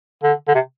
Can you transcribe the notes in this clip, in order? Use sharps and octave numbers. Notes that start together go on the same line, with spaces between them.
D3
D3
C3